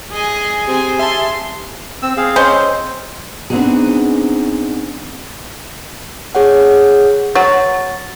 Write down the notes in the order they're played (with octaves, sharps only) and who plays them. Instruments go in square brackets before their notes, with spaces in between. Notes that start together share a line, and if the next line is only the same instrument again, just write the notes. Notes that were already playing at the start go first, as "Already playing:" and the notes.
[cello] G#4 [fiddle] D#5 G#5
[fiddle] C4 G#5 [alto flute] G4
[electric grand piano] E5 G#5 A5 [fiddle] C6
[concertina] C4 E6
C4 G#4 F5
[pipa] G#3 C#4 C5
[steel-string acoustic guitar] B3 C4 D4 D#4 F#4 G#4
[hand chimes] G#4 C#5 F#5
[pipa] F#3 [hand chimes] A6